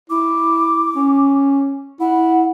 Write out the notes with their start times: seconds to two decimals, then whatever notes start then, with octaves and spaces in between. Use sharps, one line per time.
0.10 E4 D6
0.96 C#4
2.00 E4 F#5